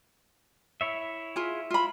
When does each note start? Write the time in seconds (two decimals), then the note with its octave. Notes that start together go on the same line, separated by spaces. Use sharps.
0.81 E4 C#5 E5
1.36 F4 G#4
1.70 F4 B5